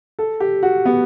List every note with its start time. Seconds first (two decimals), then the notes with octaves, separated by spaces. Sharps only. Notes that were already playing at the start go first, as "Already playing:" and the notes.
0.19 A4
0.40 G4
0.63 F#4
0.85 B3